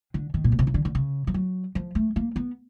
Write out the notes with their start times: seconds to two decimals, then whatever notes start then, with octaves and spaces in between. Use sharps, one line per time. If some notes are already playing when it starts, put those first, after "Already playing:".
0.14 D3
0.34 D#3
0.44 A#2
0.52 B2
0.59 C3
0.67 C#3
0.74 D3
0.85 D3
0.95 C#3
1.27 F3
1.34 F#3
1.75 F3
1.95 A3
2.16 A#3
2.36 B3